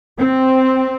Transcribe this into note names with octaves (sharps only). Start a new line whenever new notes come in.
C4